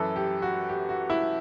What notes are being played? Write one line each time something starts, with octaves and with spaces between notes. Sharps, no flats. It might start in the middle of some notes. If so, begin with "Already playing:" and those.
Already playing: F#2 E3 A4
G4
F#4
G4
F#4
E4